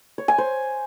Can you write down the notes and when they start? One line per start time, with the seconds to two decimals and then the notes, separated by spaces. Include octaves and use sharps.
0.18 C#5
0.28 G#5
0.38 C5